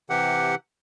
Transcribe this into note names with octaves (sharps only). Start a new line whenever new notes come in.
C3 E3 G4 F#5